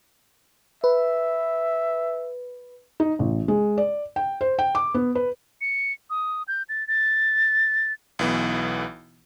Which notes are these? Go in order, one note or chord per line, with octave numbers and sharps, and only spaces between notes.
B4 E5
D#4
A1
G#3
D5
G5
C5
G5
D6
B3
B4
C#7
D#6
G6
A6
A6
B1 E3 B3